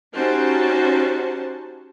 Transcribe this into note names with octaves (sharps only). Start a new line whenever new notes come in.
C#4 D#4 F#4 G4 C5 A5